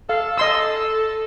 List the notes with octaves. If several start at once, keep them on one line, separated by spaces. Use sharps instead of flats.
A4 F5
D#5 C6 E6